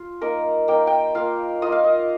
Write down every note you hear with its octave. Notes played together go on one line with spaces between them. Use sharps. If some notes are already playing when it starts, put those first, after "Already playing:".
Already playing: F4
A#3 D#4 A#4
A#3 D#4 G5
G5
A#3 F4 F5
A#3 F4 D#5
F5
D#5